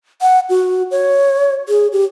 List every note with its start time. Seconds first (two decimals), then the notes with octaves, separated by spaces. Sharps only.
0.21 F#5
0.50 F#4
0.91 C#5
1.69 G#4
1.92 G4